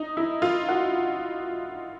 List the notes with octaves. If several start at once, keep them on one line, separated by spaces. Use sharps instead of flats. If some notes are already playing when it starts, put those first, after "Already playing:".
Already playing: D#4
E4
F4
F#4